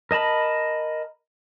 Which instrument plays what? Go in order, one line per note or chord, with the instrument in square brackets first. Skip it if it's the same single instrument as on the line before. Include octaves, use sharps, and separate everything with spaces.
[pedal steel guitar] A#4 D#5 A5 B5